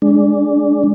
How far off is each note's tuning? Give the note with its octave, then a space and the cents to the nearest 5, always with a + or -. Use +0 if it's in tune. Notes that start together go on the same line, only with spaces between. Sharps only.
G#3 +0 D4 -5